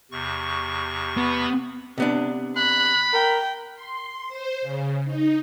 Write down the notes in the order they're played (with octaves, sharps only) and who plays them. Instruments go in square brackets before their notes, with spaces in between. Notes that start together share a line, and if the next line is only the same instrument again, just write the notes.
[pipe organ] E2 C3 C#6
[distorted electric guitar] B3
[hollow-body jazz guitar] C3 B3 D4
[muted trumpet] B5 [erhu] F#6
[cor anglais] A#4 [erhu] G5
[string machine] C6
C5
C#3
D#4